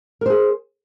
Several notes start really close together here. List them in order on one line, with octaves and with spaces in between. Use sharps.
A#4 C5 G#4